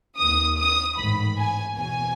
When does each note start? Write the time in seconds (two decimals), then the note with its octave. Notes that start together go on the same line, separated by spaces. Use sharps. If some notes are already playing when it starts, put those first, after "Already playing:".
0.18 D#2 D#3 D#6
0.57 D#6
0.97 A1 G#2 D#3 B5
1.37 G#5
1.76 E2 B2 G#5